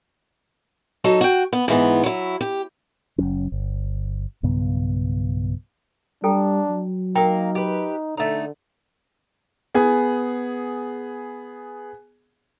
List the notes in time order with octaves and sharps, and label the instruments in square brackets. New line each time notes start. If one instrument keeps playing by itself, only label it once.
[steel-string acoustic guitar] F#3 D#4 A4
F#4 G5
B3
G#2 E3 B3
F#3 E4
G4
[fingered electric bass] F#1 F2 F#3 C#4
G1
B1 G2 C#3 B3
[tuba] G3 [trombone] D4 [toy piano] A4 G5 A#5
[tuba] F#3
[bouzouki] A#3 [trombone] D#4 [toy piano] A#4 G5
[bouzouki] G4 B4
[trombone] D3 [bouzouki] A3 D#4
[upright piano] B3 G#4 G#5